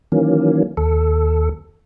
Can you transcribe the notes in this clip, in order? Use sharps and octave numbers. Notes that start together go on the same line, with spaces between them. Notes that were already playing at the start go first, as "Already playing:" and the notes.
D#3 E3 F#3 A#3 C#4
D#2 A4